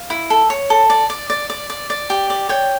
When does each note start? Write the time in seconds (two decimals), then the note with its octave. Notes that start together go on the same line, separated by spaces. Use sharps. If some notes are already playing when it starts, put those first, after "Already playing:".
Already playing: F5
0.10 E4
0.30 A4
0.50 C#5
0.70 A4
0.90 D5
1.10 D5
1.30 D5
1.50 D5
1.70 D5
1.90 D5
2.10 G4
2.30 D5
2.49 C#5 G5